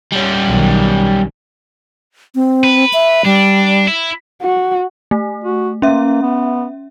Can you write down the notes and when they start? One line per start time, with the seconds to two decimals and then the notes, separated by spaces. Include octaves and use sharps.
0.13 G3 C#4
0.46 B1 D#3
2.35 C4
2.64 B4
2.93 E5
3.25 G3 D4
3.88 E4
4.42 F#4
5.11 A3
5.44 F#4
5.82 A#3 C#4 E5
6.22 B3